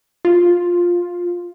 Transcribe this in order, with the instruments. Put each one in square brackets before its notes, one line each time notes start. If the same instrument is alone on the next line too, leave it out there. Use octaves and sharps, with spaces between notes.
[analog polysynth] F4